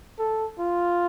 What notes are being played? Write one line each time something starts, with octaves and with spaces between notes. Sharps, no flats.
A4
F4